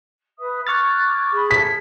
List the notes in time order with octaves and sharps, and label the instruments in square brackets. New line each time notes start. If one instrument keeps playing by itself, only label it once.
[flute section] B4 E5 D#6
[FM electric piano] C#6 F6 A6 [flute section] D6 F#6 G#6
[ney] G#4 [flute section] B5
[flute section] A4 G#6 [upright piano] B6